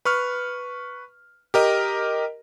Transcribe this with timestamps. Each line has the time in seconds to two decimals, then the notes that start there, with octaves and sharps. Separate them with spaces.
0.05 B4 C#6 F6
1.54 G4 A#4 D#5